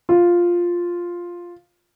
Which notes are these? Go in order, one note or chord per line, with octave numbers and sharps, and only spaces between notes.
F4